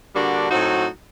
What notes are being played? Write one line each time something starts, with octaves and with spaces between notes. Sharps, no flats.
D3 G3 A#3 D4 F#4
A2 F#3 C4 D#4 F#4